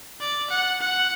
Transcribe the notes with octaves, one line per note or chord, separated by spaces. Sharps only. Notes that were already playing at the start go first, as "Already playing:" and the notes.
D5
F#5
F#5